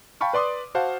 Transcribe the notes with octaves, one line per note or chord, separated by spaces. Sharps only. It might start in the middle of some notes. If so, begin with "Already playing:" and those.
F5 G5 A5 B5 C#6 F6
B4 D5 C6 D6 D#6
F#4 C5 F5 F#5 A5